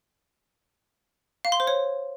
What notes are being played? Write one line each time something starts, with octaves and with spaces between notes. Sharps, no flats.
F5
C6
C5
C#5